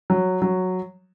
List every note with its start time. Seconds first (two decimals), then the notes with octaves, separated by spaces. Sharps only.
0.10 F#3
0.42 F#3